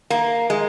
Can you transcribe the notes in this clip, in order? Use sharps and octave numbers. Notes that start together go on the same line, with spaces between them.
A#3
G#3